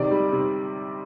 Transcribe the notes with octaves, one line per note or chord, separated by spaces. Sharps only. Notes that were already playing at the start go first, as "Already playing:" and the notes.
Already playing: C3 D#3 D5
G3
C3